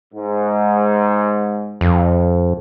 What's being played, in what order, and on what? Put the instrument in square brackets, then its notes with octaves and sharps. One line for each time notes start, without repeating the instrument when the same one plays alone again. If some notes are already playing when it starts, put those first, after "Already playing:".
[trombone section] G#2
[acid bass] F2